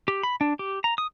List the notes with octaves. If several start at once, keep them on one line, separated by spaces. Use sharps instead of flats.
G4
B5
D4
G4
A#5
D#6